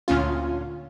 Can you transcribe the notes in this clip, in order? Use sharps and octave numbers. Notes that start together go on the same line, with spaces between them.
D2 A#2 C#4 F4